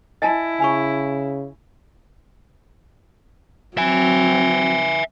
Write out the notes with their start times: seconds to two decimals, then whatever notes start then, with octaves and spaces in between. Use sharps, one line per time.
0.22 E4 D#5 G#5 A5
0.60 C#3 G#5 B5 C#6
3.77 F#3 C4 E5 G#5